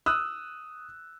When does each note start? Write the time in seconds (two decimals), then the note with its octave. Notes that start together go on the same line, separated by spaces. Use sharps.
0.06 D#6 E6 F#6